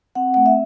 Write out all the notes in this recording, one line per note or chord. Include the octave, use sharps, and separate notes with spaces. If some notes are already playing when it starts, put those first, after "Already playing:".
C4 F#5
A3 F#5
E5